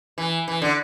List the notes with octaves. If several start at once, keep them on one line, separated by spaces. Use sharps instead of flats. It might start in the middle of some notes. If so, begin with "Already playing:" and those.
E3
E3
D3